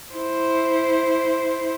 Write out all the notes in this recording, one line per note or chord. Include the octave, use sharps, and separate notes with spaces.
E4 C5